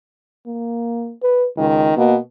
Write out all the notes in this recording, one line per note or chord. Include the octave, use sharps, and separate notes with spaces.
A#3
B4
C#2 D#3
B2 A#3